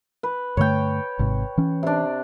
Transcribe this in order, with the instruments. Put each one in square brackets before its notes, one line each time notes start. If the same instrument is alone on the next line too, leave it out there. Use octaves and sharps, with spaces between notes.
[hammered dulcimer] B4
[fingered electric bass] G2 D3 A3 [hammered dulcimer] C#5 G5
[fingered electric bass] G#1 G#2 C3
E3 C#4
[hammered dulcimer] C3 D4